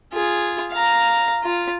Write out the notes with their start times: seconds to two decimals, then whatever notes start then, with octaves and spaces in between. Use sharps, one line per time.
0.13 F4 G#4
0.71 F5 A#5
1.44 F4